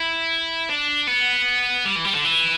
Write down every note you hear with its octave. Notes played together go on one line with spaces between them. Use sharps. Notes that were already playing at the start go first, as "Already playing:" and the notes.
Already playing: E4
D4
B3
G3
E3
G3
D3
E3